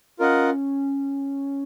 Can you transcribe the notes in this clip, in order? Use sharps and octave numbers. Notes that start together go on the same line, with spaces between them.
C#4 F4 A#4 D#5 F#5